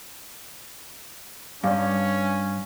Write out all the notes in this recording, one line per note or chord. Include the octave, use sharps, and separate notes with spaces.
G2 C#4 D5 F5